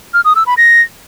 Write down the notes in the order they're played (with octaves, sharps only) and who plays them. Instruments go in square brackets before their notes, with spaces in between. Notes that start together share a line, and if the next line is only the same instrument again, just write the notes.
[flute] F6
D#6
E6
B5
A#6